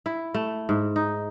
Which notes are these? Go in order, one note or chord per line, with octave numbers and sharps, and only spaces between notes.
E4
A3
G#2
D#4